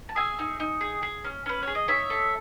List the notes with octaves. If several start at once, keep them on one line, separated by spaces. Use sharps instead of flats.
A5
G#4 E5 G#5
D#4
D#4
G#4
G#4
C#4
C#4 B4
G#4 C#5
D#5
D#4 C#5 E5
A4